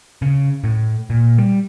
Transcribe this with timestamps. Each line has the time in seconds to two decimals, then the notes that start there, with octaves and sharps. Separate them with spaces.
0.22 C#3
0.64 A2
1.10 A#2
1.38 G3